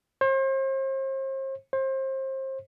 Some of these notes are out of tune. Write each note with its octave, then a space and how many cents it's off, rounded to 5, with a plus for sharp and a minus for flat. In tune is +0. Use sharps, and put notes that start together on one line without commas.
C5 +40
C5 +30